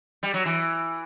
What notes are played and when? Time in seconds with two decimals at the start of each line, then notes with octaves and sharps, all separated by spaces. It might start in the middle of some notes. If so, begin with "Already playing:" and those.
0.23 G3
0.34 F#3
0.45 E3